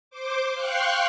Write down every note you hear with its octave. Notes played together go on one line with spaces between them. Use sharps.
C5 D6
F5 G5 C6 C#6 F#6